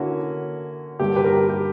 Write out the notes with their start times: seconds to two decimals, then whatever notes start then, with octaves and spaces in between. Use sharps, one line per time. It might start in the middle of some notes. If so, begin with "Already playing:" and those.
Already playing: D3 A#3 C#4 E4 F#4
0.99 G2 D3 A#3 G4
1.16 G4 B4
1.24 A#4
1.33 G4
1.49 G4